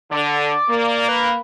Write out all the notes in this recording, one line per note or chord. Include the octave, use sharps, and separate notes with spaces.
D3 D5
A#3
B4